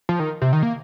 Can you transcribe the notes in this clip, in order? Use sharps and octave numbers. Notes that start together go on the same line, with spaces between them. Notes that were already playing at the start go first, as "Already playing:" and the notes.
F3
D#3
C3
D#3
A#3